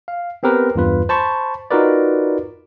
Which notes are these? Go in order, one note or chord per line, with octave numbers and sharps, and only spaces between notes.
F5
B3 C4 G4 A#4 B4
E2 G2 F4 B4
C5 A5 B5 C#6
D#4 F4 F#4 A#4 B4 D5